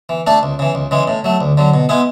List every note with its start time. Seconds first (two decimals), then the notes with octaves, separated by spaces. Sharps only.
0.09 E3
0.27 A3 D4 A4
0.43 C#2
0.59 C#3 E3
0.75 C#2
0.91 C#3 E3 G#3
1.08 A2
1.24 F#3 A3
1.41 D2
1.57 D3 F#3
1.74 B2
1.89 G#3 B3 E4 G#4